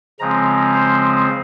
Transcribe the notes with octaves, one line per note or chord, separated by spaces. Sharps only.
C#3 F3 G#3 C4 A#5
C5